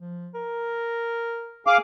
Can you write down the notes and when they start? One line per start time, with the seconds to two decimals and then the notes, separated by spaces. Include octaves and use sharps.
0.01 F3
0.34 A#4
1.67 G#4 F5 D6